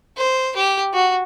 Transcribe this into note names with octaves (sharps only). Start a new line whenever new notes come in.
C5
G4
F#4